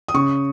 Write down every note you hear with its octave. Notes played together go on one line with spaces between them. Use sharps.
D#6
C#3 C#6